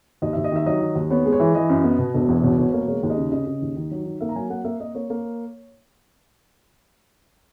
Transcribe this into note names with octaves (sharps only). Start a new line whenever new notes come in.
D#2 D#5
D#2 E5
D#5
D#3 E5
F#3 D#5
D#3
D#2
B3 C#5
G#3
C#5
E3
E3 D#5
F#2
B3
B2
E1
E2
B2 C#5
E1 C#5
A#3 C#5
G#3 C#5
D#2
D#5
C#3
C#3 D#5
C#3
D#2
D#3
F#3
D#3
A#3 E5
A#5
F#3 G#5
A#3 F#5
A#3 E5
A#3 D#5
A#3 C#5
A#3